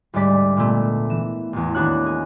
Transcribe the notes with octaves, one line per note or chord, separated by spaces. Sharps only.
D2 G#2 G3 D5 B6
A#2 D3 A3 B3
E3 E7
A1 E2
D#2 B3 D4 F#4 C#5 F#6
G#4